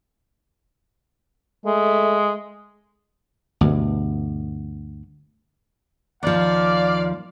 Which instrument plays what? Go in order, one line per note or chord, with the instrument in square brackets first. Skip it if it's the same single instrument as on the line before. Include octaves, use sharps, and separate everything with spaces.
[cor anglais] G#3 [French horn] A3
[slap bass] D2 G2 B2
[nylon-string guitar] D#2 F3 [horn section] D5 F5